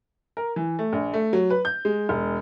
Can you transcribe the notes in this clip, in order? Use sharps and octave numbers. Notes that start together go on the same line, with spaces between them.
A#4
E3
A3
A#1
A3
F#3
B4
G6
G#3
E1